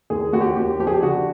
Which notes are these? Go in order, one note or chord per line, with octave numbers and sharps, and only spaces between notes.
D#2 G#4
D#2 F#4
G4
F#4
D#2 G4
F3 G4
G#4
G4
D3 F#4